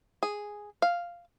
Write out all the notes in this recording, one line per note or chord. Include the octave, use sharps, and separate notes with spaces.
G#4
F5